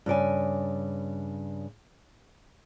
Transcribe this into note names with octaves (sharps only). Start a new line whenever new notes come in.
G2 C#3 D5 G#5